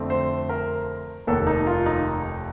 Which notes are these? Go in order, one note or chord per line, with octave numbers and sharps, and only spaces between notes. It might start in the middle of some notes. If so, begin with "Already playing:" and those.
Already playing: F2 D3 A3 C4
C5
A#4
F1 D#2 D#3 A4
D#4
F4
D#4